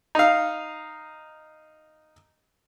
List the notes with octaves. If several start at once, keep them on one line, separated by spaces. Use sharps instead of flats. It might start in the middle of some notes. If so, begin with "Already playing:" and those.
D#4 F5